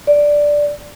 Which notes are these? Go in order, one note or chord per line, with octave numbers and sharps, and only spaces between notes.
D5